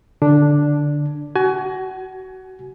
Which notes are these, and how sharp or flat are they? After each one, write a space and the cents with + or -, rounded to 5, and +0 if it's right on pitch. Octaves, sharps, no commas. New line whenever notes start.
D3 +0 D4 +0
F#4 +25 G#5 +25